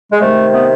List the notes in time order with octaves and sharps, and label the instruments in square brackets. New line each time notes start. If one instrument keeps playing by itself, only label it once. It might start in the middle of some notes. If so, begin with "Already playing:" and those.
[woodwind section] G#3
C3 D#3 A3
A3 B3